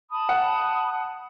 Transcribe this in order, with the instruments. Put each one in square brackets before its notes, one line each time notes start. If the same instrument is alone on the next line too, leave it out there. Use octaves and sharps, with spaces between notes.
[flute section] A5 B5 D#6
[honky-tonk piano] F#5